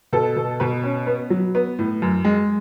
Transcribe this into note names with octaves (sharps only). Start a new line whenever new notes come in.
B2 A4
B2
B2 B4
C#4
B3
F#3
B3
A2
F#2
G#3